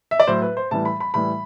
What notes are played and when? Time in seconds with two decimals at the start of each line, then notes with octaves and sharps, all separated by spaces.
0.11 E5
0.20 D5
0.27 A2 F#3 C5
0.42 B4
0.57 C5
0.71 A2 E3 G3 A5
0.85 B5
1.00 B5
1.14 A2 E3 G3 B5